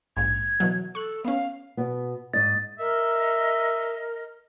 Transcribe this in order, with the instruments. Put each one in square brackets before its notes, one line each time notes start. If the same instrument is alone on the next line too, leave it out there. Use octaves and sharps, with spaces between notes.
[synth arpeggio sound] A#1 G#2 [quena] G#6
[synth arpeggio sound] B2 E3 F#3
[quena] A4 [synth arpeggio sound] C#6 F#6
[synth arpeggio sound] B3 C#4 [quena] F5
[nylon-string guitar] B2 B3
[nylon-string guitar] G#2 D#5 [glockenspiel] A6
[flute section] A#4 D#5 [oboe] E5